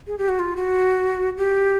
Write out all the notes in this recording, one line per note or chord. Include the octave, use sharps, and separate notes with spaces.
G#4
G4
F#4
F4
F#4
G4